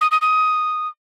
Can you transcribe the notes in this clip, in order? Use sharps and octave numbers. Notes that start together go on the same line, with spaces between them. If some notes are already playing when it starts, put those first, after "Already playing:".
D#6
D#6
D#6